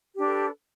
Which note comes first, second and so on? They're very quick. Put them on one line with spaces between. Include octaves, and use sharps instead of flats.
G4 D4 B4 A4